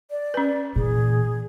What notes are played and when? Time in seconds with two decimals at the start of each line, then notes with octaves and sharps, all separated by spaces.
0.10 D5
0.34 C#4 B4
0.76 A#2 E3 G#4